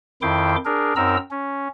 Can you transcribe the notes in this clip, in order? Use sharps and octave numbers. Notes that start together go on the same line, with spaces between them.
F2 D#3 E4 G5 C6 D6
D4 G#4 A#4
F#2 C4 D#4 A#4 A#5 E6
C#4